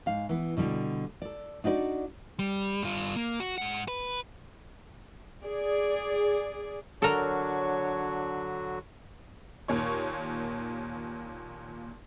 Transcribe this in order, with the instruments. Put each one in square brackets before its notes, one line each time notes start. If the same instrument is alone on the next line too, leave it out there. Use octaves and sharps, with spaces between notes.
[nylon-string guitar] G#2 F5
E3 B3
B2 D3 G3
A4 D5
D4 D#4 F#4 B4 D5
[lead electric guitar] G3
G2 F4
A#3
F#4
G#2 F#5
B4
[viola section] G#4 D5
[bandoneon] D3 F#3 F#4 [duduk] D4 [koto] A4 A#4 [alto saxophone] C#5
[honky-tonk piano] D#2 A#2 C#5 C#6